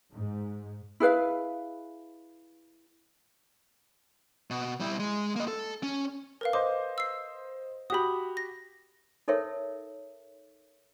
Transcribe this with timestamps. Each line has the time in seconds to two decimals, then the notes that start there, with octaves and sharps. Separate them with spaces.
0.12 G#2
1.00 E4 G#4 B4 F5
4.50 B2
4.80 G3 E4
5.00 G#3
5.36 A#3 D#5
5.48 A4
5.83 C#4
6.41 A#4 B4 F5
6.53 C5 D#5 D6
6.98 E6 C7
7.90 F#4 G4 B5 D#6
8.37 A#6
9.28 D#4 A4 A#4 C#5 E5